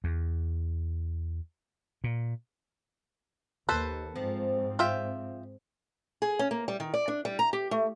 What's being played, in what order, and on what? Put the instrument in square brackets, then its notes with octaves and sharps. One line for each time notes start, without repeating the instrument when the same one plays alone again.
[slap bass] E2
A#2
[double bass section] D#2 [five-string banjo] A4 B4 C5
[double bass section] G#2 C4 [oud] F3
[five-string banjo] F4 E5 G5
[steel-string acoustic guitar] G#4
C#4
A#3
G3
D#3
D5
D4
G3
A#5
G4
A3